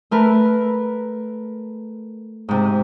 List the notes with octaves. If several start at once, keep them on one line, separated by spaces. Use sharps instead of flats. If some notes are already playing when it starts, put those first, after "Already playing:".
A3 A#4 B4
G#2 C3